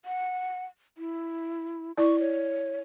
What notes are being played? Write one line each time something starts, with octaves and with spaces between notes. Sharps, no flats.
F#5
E4
E4 D5 C#6
C#5